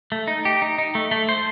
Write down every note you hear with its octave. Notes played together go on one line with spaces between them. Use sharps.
A3
D#4
G4
D#4
D#4
A3
A3
C5